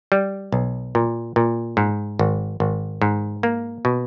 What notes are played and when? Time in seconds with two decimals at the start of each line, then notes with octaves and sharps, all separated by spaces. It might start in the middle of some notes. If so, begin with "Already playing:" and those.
0.12 G3
0.52 B1
0.95 A#2
1.36 A#2
1.77 G#2
2.19 G#1
2.60 G#1
3.02 G#2
3.43 A#3
3.85 B2